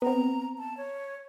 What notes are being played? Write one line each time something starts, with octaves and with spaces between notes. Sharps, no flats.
B3 C4 A#5
A5
C#5